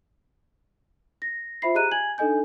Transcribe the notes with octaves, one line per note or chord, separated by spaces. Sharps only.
A#6
F4 C5 E5 B5 C7
G4 G#4 D#5 A#5 F#6 D#7
G#5 G#6 F#7
D4 D#4 A4 D#5 G#5 G6